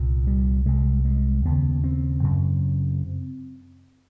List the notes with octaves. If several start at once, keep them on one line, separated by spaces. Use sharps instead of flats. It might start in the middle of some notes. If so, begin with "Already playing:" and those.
Already playing: C2 A#2
G3
C2 C3 G#3
G#3
D#2 C#3 B3
C4
F#2 C#3